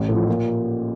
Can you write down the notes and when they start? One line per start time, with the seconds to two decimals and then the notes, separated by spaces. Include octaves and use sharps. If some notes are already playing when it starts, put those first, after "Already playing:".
Already playing: A1
0.09 A2 F3
0.28 A#2